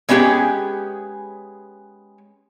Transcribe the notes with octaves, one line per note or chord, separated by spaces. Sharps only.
G#3 B3 C#4 G4 G#4